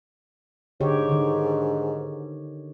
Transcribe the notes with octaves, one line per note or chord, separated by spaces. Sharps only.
G#2 D3 G4 C#5
D3 D#3